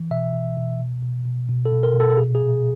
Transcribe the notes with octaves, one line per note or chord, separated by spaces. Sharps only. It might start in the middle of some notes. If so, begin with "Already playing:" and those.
Already playing: E3
B2 E5
B2
B2
B2
B2
B2
B2
A4
B2
A#4
B2
A4
A4
A#2 G#4
G#4
A#2